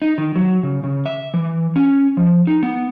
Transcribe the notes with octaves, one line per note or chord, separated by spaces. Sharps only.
D#4
D#3
F#3
C#3
C#3
E5
E3
C#4
F3
D#4
B3